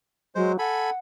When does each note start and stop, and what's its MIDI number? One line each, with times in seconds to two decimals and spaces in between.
0.35 0.57 54
0.35 0.52 56
0.35 0.52 72
0.59 0.90 69
0.59 0.98 78
0.59 0.90 80
0.59 0.90 83